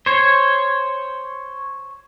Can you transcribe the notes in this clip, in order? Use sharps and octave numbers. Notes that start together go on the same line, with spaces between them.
C5 C#5